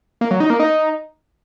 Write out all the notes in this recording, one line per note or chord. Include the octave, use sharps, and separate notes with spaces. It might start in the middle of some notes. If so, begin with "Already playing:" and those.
A#3
F#3
D#4
A#3
D#4